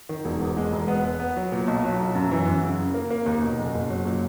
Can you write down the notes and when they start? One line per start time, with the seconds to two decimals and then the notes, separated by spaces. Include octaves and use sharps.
0.09 D#3
0.25 E1
0.41 E2
0.57 G#3
0.73 E1
0.88 B3
1.05 B3
1.20 B3
1.36 F#3
1.52 A#2
1.68 B1
1.84 F#3
1.99 B1
2.15 F#2
2.31 E3
2.47 F#2
2.63 C#3
2.79 C#3
2.94 A#3
3.11 A#3
3.26 D#2
3.42 B2
3.59 F#1
3.75 F#1
3.90 F#3
4.05 A#2